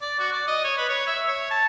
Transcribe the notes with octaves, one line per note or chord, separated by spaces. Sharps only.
D5
F#4
D5
D#5
C#5
B4
C#5
E5
C#5
A5